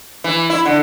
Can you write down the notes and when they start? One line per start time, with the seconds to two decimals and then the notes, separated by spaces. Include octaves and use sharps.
0.24 E3
0.50 E4
0.65 D3